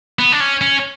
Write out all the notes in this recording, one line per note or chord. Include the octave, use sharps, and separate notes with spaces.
B3
D4
C#4
C#4